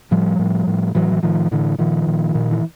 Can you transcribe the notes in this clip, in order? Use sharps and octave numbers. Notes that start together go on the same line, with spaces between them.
A2 F3 G3
A2
A2
A2 E3 F#3
E3
A2 D#3 F3
A2 D3 E3
A#2 D#3 F3
A#2
A#2
E3